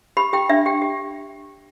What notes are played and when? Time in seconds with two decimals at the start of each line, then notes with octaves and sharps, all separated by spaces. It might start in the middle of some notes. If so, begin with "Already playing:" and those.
0.17 G4 B5
0.33 G4 G5
0.49 D4 E5
0.66 G4 G5
0.82 G4